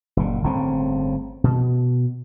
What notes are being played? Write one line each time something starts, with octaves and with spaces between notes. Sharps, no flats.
F#1 A#2
G1 A2 C#3 C4
B2